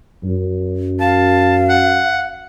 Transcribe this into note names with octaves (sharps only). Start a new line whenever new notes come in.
F#2
F5 A5
F#5